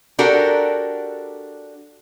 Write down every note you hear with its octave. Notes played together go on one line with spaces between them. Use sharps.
D4 F#4 G4 A4 A#4